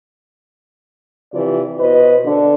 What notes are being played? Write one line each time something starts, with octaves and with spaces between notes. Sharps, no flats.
C3 E3 F3 D5
B2 B4 C5 D#5
D3